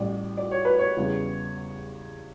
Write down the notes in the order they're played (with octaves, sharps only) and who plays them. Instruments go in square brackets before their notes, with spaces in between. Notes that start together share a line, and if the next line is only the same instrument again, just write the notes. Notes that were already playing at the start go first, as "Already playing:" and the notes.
Already playing: [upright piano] A1 A2 G3 D5
D5
C#5
B4
C#5
E2 C#3 G3 B3